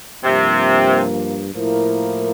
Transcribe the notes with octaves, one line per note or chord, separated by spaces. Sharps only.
G2 C3 F3 A#3
A2 F3 A#3 E4 A#4